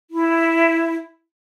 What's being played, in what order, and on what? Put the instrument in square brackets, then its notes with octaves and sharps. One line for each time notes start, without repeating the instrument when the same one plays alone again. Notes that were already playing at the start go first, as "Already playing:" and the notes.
[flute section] E4